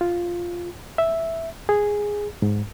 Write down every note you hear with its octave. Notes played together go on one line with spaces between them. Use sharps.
F4
E5
G#4
G#2